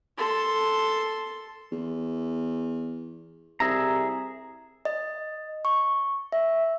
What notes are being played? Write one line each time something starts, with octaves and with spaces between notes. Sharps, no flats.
A4 C6
E2
C2 G#4 E5 A#5
D#5
C#6
E5